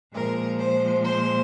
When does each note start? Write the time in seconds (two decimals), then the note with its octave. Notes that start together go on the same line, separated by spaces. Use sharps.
0.13 A#2 F3 G#3 A#4
0.59 C5
1.05 C5